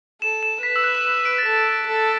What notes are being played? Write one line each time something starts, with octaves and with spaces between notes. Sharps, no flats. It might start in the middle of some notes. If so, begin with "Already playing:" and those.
A4 E7
E7
B4 B6
E6
F#6
E7
E7
D7
A6
A4 B6
A4